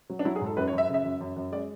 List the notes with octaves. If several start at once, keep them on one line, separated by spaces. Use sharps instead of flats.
F#3
D4
F#3 E4
G#4
G#2
A4
F#2 B4
C#5
F#2
E5
C#3 E5
F#2
F#2
F#2
G#3 D5